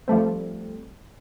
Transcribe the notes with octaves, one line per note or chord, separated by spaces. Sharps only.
F3 G3 A3 C4